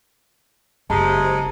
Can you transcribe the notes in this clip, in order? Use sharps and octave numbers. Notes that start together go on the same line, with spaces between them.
F#1 C3 G#3 A5 A#5